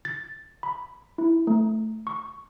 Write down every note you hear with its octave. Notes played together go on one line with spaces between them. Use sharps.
A6
B5
E4
A3
C#6